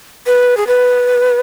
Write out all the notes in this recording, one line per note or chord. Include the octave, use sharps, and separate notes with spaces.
B4
G#4
B4